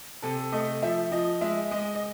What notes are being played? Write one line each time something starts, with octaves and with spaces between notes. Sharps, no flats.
C3 A4
A3 D#5
F3 E5
F3 D#5
G#3 E5
G#3 D#5
D#5